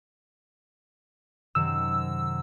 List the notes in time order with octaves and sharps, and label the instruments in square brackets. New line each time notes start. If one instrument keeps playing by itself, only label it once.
[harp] F#2 C3 D#3 [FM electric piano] E6